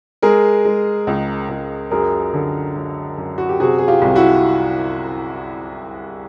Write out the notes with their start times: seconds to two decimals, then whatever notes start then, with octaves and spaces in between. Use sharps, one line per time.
0.22 G#3 G#4 A#4
0.65 G#3
1.07 C#2
1.49 C#2
1.91 F#2 G#4 A#4
2.33 D3
2.76 F#2
3.18 F#2
3.38 F#4
3.49 G4
3.60 C3 F#4 G#4
3.78 G#4
3.88 F4 G4
4.02 C2
4.16 E4 F#4